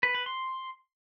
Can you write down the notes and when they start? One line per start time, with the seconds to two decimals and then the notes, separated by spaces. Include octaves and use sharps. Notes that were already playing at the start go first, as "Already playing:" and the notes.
0.03 B4
0.15 B4
0.26 C6